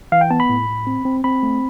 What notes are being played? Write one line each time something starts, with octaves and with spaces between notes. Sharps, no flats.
E3 F5
G5
B3 A5
B5
A2
A2
C4
C4
C4 B5
A3